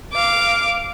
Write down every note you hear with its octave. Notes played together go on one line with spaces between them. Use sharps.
F5 D6